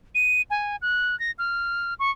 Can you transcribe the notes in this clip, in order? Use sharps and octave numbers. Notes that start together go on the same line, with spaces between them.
D#7
G#5
F#6
A#6
F6
C#6